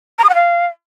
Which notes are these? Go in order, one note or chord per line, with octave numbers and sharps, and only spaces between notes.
A#5
D#6
F#5
F5